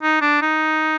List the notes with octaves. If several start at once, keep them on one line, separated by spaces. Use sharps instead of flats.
D#4
D4
D#4